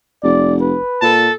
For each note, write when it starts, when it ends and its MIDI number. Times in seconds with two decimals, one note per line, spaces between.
0.23 0.76 29
0.23 0.55 74
0.61 1.12 71
1.02 1.29 46
1.02 1.33 69
1.02 1.33 81